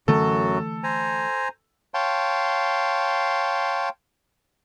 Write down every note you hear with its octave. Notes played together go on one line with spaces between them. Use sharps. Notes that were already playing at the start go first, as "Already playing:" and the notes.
F#2 D3 E3 F#3 A3 F#4 A4
C5 G#5 A#5
C#5 F5 G5 A5 C6